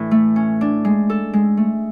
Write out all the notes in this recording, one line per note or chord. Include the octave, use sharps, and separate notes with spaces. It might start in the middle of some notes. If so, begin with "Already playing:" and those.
Already playing: A2 E3 D4
A3
C#4
D4
G#3
A4
G#3
A3